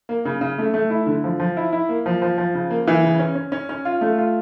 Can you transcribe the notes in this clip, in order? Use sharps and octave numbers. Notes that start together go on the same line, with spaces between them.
A#3
C#3
C#3
A3
A3
E4
D3
F3
F3
E4
E4
A#3
F3
F3
F3
C#3
A#3
E3
C#3
C#4
C#4
C#4
C#4
F4
A3
F4